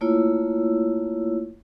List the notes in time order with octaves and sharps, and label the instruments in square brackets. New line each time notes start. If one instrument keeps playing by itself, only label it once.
[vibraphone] A3 A#3 E4 F4 C#5 E6